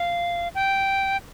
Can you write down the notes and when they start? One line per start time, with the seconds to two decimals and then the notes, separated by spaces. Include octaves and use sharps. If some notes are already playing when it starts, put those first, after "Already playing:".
Already playing: F5
0.55 G5